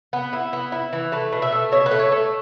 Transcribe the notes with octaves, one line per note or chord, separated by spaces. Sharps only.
B3
E4
B3
E4
E3
A3 B4
B2
E5
A3
B2 C#5
B4
A3
C#5
A3